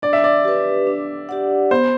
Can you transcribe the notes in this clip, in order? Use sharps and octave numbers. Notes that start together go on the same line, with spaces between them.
D4 D5
E5
D5
G4 B4
D4
G4 D5 F#5
B3 C5